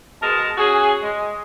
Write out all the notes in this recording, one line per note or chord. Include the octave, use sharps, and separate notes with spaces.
B2 G#3 A#4 D#5 A5
C#4 F#4 G#4
G#3